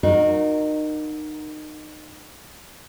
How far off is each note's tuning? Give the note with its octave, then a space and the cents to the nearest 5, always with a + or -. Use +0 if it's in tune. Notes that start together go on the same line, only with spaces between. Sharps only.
D#4 -25 F#4 -30 A#4 +0